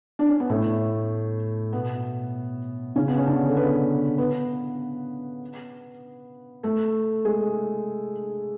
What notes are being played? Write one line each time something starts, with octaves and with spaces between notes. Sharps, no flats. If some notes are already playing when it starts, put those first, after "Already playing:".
D4
C#4
B3
A2 A3
B2 B3
C#3 C#4
B3
C#4
D3 D4
A4
B3 B4
B3 B4
A3 A4
G#3 G#4